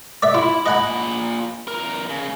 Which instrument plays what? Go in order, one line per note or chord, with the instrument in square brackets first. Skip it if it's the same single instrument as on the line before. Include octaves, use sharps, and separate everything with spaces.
[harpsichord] D5 E5
[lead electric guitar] E4 [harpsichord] F4
[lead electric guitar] A#2 B5 [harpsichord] D#5 F#5 G#5
[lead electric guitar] E2 A#4
C#3